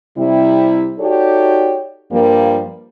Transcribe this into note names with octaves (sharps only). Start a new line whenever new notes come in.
C3 G3 E4
D#4 F#4 G4 A4 C#5 D5
G2 F3 G3 A#3